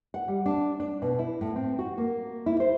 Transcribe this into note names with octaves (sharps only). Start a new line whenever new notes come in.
F#5
G3
D4
D4
B2
E4
A2
C4
F#4
A#3
E4
C5